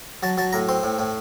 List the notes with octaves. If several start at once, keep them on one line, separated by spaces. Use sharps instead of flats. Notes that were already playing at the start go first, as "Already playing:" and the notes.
F#3 A5
F#3 A5
A2 A#5
C4 C6
A2
A2